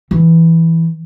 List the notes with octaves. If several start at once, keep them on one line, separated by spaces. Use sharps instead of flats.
E3